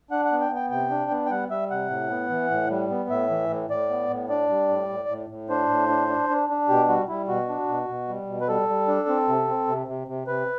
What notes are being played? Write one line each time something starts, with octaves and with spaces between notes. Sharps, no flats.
D4 F#5
F#5
B3
G5
B3
G5
C3 G5
D4
B3
G5
G3 F#5
G3 E5
C3 F#5
A2
B3
E3
A2
G3
B3
A2 E5
E3
A2
A2 D5
B3
A2
D4 D5
G3
A2
A2
A2
A2
D4 C5
A2
D4
D4
D4
D4
B2 G4
G3 F#4
G3 E4
B2 F#4
D4
B2
B2
G3
B2
B4
G3 A4
G3
D4
C4
C3
C4
C3
C3
C3
C3 B4